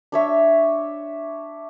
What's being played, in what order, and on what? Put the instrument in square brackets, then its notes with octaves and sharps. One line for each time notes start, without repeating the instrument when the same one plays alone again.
[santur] D4 C#5 E5